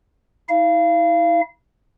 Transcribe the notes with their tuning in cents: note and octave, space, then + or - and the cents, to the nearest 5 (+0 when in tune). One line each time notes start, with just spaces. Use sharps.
E4 -40 F5 -30